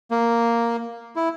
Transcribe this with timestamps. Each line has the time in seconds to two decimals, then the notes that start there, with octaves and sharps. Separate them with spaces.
0.11 A#3
1.16 E4